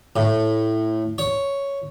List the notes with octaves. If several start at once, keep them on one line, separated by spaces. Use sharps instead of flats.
A2
C#5